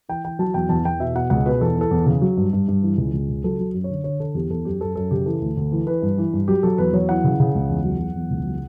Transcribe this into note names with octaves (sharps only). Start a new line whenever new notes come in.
E3 G5
E3 G5
F#3 A5
E2 G5
E2 A5
E2 G5
B2 E5
B2 F#5
C#2 F#5
B2 B4
E2 A4
E3 A4
E2
C#3
F#3
G2
G2
G2
E3
C#2
C#2
C#3
F#3 A4
F#3
F#2
C#5
D3
D3 C#5
D3 A4
E2 G4
E2 A4
F#2 G4
F#2 A4
F#2 A4
C#3 G4
E3 A4
D2
D2
E3
E3 B4
G2
E3
G2
F#3 G4
F#3 A4
E2 B4
F#3 C#5
E3 F#5
C#3
C#3
C#2
E2
F#3
F#3
E2
C#2
F#3